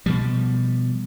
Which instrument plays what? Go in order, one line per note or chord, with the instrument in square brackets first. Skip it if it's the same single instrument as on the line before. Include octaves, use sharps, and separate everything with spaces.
[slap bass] B2 F3 G3